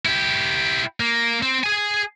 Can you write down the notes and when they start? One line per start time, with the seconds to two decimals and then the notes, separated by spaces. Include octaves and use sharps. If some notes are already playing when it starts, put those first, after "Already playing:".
0.05 E4 G4
1.00 A#3
1.42 C4
1.64 G#4 G#5